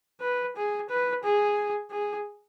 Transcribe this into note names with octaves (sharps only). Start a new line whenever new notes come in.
B4
G#4
B4
G#4
G#4